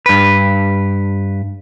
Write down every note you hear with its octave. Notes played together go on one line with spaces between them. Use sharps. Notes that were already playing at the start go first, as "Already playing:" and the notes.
G2 B4